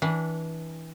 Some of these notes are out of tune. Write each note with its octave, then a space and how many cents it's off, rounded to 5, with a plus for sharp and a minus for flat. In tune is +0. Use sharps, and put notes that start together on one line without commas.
E3 -25 D4 -25 F#5 -15